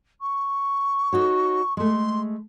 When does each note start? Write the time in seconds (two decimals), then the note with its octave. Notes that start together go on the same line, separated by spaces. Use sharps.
0.21 C#6
1.13 D#4 F#4 C#5
1.77 G#3 A3 C6